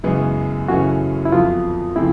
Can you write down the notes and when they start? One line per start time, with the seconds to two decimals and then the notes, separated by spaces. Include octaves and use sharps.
0.04 F#2 C#3 E3 G#3 B3
0.68 F#2 C#3 E3 A3 C#4 F#4
1.25 E4
1.32 F2 D3 F#3 B3 F4
1.96 C#3 F3 A3 C4 E4